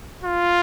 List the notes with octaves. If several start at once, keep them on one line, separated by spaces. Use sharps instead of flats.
F4